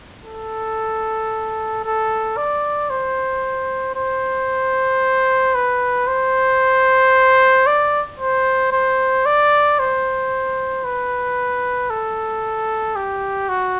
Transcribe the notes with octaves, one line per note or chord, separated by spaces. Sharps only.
A4
A4
D5
C5
C5
B4
C5
D5
C5
C5
D5
C5
B4
A4
G4
F#4